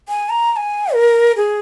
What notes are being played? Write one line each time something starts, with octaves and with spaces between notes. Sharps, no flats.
G#5
A#5
A#5
G#5
A#4
G#4